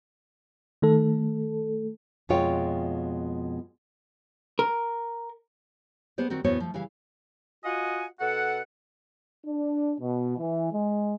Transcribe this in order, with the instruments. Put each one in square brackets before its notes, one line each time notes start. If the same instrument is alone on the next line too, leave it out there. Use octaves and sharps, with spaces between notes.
[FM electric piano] D#3 A3 A4
[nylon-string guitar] F2 B2 G#3 F4 C#5 G5
[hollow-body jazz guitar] A#4
[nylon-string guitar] B3 G#4 C5 D5
D#3 C4 F#4
E2 A2 B3 F#4 C5 C#5
F3 A3
C#3 E3 G3 F5
[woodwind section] F4 F#4 D#5 F#5 G#5
B2 A4 F#5
[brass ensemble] D4
B2
E3
G#3